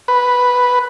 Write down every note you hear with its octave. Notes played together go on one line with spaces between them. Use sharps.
B4